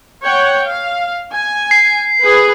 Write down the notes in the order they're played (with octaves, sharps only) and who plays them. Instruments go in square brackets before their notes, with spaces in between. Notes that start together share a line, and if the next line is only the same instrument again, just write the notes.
[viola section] C#5 F#5 G5
F5
G#5
[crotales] C7
[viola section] G#4 B4